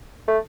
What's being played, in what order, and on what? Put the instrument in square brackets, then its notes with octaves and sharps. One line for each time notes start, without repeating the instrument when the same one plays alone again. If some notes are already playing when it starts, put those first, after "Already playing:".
[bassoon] A3